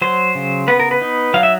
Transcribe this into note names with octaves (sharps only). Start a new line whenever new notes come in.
F#3 C5
C#3
B3 B4
A#4
B4
D#4
F#3 F5
E5